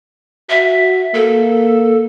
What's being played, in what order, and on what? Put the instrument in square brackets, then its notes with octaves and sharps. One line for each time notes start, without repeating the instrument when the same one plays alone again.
[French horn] F#4 [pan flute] E5
[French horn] A#3 [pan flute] A4